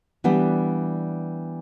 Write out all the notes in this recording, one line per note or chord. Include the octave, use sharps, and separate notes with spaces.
E3 G3 B3 D4